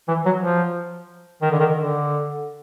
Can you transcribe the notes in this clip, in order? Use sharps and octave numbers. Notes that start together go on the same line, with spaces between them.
E3
F#3
F3
D#3
D3
D#3
D3